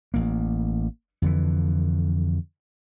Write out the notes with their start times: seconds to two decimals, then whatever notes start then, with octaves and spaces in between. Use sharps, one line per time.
0.14 A1 A#3
1.22 F2 D3 E3